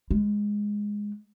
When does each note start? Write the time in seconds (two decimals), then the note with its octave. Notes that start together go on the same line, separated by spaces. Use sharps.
0.11 G#3